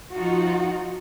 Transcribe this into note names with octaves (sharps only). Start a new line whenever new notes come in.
F3 D#4 F4 F#4